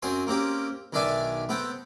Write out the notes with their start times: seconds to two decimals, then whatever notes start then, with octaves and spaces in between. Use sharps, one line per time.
0.03 F#2 C4 G#5 C6
0.27 A#3 C4 C#4 G4
0.93 B1 D#3 D4 D5 E5 G#5
1.49 B3 C4 A4 G5